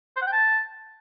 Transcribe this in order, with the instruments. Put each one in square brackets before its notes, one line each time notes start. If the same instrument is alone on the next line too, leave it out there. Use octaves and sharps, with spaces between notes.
[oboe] C5
F#5
G5
A5